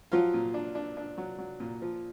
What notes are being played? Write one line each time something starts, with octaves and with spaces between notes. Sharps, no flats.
F3 F#3 F4
A#2
D4
D4
D4
F#3
F#3
A#2
F3